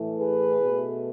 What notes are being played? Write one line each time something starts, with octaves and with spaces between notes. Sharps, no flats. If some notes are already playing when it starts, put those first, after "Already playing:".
Already playing: A2 E3 A3
G#4 B4
B2
A3